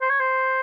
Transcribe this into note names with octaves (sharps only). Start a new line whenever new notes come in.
C5
C#5
C5